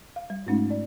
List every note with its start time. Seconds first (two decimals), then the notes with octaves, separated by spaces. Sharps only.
0.16 F5
0.30 G3
0.46 G#2 G#3 A3 C#4 D#4
0.70 D5